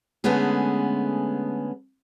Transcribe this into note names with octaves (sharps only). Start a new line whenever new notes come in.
D3 G#3 A3 B3 C#4 G#4